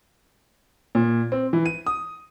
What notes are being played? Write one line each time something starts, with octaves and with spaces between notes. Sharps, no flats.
A#2
C4
E3
D#7
D#6